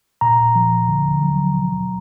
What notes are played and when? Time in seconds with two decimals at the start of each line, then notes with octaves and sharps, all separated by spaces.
0.21 A#2 A#5
0.55 F3
0.89 D3
1.22 F#3
1.56 B2